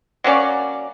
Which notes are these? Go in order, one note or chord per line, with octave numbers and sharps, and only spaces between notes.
F#3 A#3 C#4 D5